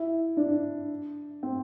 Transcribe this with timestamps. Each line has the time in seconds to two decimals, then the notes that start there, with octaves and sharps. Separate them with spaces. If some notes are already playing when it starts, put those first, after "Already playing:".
Already playing: E4
0.37 D4
1.43 C4